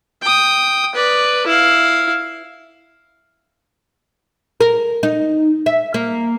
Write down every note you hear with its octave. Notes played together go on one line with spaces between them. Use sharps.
G5 D#6
B4 D5
E4 F5
A#4
D#4
E5
A#3